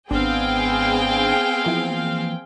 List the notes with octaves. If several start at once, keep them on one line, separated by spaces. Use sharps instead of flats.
G#1 B3 C4 D4 G#4 F5 G5
E3 F3 A#3